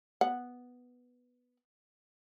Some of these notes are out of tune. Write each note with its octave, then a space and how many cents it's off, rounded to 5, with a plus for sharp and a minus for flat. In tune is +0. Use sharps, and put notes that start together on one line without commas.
B3 +0 F#5 +0